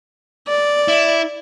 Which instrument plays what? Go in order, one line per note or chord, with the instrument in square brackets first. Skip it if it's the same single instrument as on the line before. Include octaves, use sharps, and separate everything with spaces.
[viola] D5
[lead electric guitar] E4